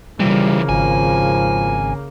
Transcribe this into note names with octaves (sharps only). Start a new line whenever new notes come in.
C#3 E3 F3 G3 A#3
G#1 F3 G#5